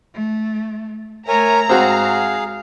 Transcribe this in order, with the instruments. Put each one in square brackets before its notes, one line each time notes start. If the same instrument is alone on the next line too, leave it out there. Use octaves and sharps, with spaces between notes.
[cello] A3
[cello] A3 E5 [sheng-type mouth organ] A#4 C#5 G#5 [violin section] A#5
[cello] G#2 [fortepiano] C4 F#4 [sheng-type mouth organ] G#4 F5